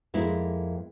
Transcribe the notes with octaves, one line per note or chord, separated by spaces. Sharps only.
F2 G#3 A#3 E4